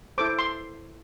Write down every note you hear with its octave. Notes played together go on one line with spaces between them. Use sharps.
E4 A4 C5 D6
C6